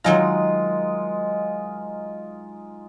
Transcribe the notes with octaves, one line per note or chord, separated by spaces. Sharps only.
D#3 F#3 G#3 D#4 F4 A#5